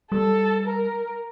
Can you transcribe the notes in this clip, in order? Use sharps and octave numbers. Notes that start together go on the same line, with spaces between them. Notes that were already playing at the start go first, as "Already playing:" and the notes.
G3 A4
A#4